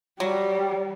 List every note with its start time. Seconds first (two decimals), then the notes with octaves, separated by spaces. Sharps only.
0.20 F#3 G3